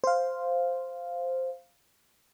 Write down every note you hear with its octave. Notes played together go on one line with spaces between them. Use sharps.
C5 F5